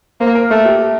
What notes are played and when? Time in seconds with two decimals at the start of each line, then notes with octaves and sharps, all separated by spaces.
0.20 A#3 C5
0.35 A#4
0.50 A3 A4
0.65 G4